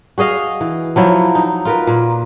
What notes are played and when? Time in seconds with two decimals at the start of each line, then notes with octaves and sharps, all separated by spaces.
0.18 F#4 G#4 D#5 F5
0.61 E3
0.96 F3 F#3 E4
1.35 D#4
1.65 F4 A#4 B4
1.87 A#2